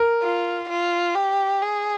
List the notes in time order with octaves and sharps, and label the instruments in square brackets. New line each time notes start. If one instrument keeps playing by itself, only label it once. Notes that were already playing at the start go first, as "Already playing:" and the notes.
Already playing: [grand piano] A#4
[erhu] F4
F4
G4
G#4